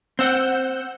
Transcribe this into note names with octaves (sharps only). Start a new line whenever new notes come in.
C4 F#5 E6 G6